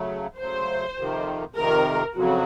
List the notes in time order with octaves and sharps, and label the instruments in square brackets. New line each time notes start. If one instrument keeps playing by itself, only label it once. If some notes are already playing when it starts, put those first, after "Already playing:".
Already playing: [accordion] C#3 F#3 A3
[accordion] C#3 F#3 A3 [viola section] C5
[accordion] F2 C3 D#3
[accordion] F2 C3 D#3 [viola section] A#4
[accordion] F2 C#3 F#3 [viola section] F#4